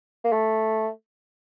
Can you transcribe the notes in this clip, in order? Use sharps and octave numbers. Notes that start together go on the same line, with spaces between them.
A#3
A3